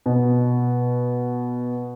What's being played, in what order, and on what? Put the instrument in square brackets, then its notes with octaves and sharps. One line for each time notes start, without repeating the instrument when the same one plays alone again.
[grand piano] B2